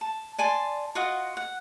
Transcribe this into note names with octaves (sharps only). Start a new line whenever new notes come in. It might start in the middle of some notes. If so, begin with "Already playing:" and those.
A5
D5 G#5 A5 C6
F4 F#4 D#5 F#5
F#5